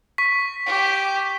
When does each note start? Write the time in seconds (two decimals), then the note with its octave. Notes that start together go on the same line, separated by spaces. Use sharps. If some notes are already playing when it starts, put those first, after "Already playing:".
0.18 C#6 B6
0.66 G4